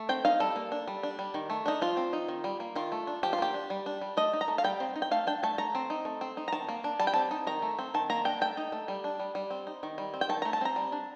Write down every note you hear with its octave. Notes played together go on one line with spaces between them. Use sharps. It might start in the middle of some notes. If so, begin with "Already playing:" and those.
Already playing: A3
C4 G5
D#4 F5
G3 A4
A#3
D4
G3
D4
G3
D#3
A3
D4 D#4
F3 F4
C4
D#4
D#3
G3
A#3
D#3 F4
A3
D4
F3 G4
F4
A#3 G4
D4
G3
D4
G3
A3 D#5
D#4
A#5
A3
F5
G3 G5
C4
D#4
G5
A3 F5
D4 G5
A3 A5
A3 A#5
C4
D#4
A3
C4
D#4
A#5
D#3 A5
A#3
D4
G3 A5
G5
C4 A5
D#4
D#3 A#5
A3
C4
D#3 A5
A#3 A#5
D4 G5
A3 G5
D#4
A3
G3
D4
G3
G3
C4
D#4
D#3
G3
C4
G5
D#3 A5
A3 A#5
A5
C4 A#5
G3
D4